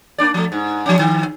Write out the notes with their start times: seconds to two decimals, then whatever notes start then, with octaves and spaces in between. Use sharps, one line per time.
0.18 A#3 D4 D5
0.34 F3 A3
0.52 G#2
0.86 F3 C#4
0.99 D#3